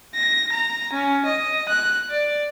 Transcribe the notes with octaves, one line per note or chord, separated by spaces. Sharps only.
A#6
A#5
C#4
D#5
F#6
D5